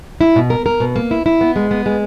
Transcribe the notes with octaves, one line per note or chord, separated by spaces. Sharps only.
E4
B2
A#4
A#4
B2
A#3
E4
E4
B3
G#3
B3
G#3